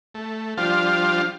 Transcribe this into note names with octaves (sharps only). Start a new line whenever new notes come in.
A3
F3 G3 D4 F4 C5 F5